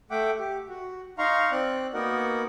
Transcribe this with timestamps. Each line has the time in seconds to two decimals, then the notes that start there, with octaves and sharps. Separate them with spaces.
0.11 A3 E5 F#5 G5 D6
0.39 G4
0.69 F#4
1.18 D#4 F5 A#5 C6 C#6
1.52 C4 D5 F#6
1.94 A#3 B3 D#4 F#4 A#4 F#5